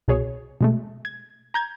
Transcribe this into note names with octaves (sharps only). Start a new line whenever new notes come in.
C2 B2 G#4 C#5
B2 G#3 A3
G#6
A#5 G6 G#6